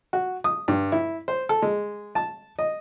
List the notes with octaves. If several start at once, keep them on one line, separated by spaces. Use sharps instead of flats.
F#4
D#6
G2
E4
C5
A4
G#3
A5
D#5